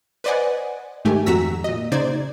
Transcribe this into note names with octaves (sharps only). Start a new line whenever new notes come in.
B4 C5 D5 D#5 F#5 G#5
G#2 D#3 A3 G4 G#5
F2 F#4 A#5 E6 B6
A#2 D#5
C#3 D#4 C5 D5 G#6